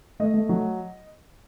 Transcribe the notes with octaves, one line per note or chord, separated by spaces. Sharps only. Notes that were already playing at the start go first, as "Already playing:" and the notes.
A3 D#5
A3
F#3